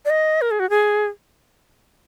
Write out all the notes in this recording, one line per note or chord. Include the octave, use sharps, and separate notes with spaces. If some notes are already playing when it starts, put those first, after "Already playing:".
D5
D#5
A#4
G#4
F#4
G#4